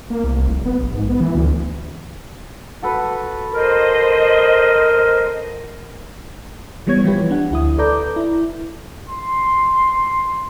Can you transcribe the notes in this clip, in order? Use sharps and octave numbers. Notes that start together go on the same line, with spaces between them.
A#3
C2
F1
B3
A#1
G#2
B3
E3
D2
F#4 A4 B4
A#4 C5 D#5
E3 G3 B3 C#5 G#6
E3 F3 E4 F4 G4 B4
D4 F#5
D2 E4 D#6
A4 B4 D5 A#5 D6 G6
E4
C6